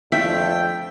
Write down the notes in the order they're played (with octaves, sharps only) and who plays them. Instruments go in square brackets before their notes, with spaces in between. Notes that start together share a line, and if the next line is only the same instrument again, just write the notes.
[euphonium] F2 [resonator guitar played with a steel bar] A3 D4 F4 [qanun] E5 [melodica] G5